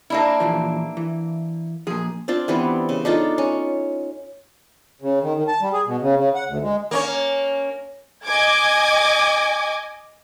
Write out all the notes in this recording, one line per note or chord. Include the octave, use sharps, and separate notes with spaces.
A#3 D4 E4
A#2 E3 F3
E3
A#2 F3 G#4
C4 D4 F4
E3 G3 B3 C4
C#3
D4 D#4 F4 A4
C#4
C#3
D#3
D#3
A5
G3
G#4
B2
C#3
C#3
F#5
D2
G#3
A#3 C#4 C#5
D#5 G#5 D6 G#6